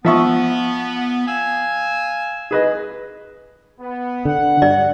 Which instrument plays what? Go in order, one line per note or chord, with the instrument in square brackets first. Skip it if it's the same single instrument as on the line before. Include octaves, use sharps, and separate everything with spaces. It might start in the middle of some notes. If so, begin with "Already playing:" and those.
[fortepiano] F3 E5 C#6 [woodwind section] B3
[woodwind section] F5 G#5 E6
[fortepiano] G#4 B4 D#5
[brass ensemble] B3
[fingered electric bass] D3 [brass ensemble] F#5
[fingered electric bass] G2 [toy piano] D5